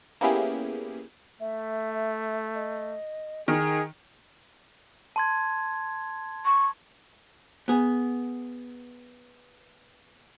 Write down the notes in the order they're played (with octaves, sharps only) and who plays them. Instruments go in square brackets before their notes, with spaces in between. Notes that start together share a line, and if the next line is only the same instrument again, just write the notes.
[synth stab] A#3 B3 C#4 E4 G4 G#4
[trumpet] A3 [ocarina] E5
[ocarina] D#5
[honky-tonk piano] D#3 [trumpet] G#4
[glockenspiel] A5 C6 G#6
[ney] C#6
[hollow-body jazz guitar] B3 G#4